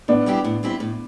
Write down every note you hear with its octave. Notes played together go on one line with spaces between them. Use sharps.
A2 B3 D4
G3 C4 E4 G4
A2
G3 C4 E4 G4
A2